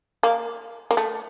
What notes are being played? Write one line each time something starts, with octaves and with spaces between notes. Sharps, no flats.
A#3
A#3
A3